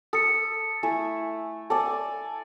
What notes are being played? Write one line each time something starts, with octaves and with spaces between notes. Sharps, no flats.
A4 D#6 C#7
A3 E4 E5 G#5
A4 D5 G#5 A5